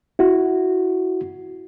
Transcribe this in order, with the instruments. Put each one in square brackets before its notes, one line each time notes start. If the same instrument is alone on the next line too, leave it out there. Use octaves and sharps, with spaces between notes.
[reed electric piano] E4 F#4